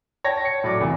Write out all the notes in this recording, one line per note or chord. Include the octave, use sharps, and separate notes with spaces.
C#5 G5 A5 A#6
C#7
A2 F#3 D5 D6
F1 E2 C3 E3